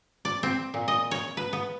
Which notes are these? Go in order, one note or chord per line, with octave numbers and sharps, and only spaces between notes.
D5
C4
A#2
D#5
C#5
B4
B3